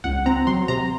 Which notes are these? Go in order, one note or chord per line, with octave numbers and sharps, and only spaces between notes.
C#2 F#5
C4 A#5
F#3 C6
C3 A#5